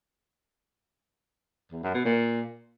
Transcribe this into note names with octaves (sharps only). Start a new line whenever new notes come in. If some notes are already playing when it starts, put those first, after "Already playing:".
E2
F#2
B2
A#2